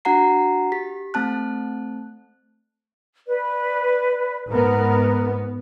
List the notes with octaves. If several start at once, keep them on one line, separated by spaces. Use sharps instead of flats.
D4 F#4 F#5 A#5 C7
G4 B6
A3 C4 A5 F#6
B4 D5
G#2 B3 A#4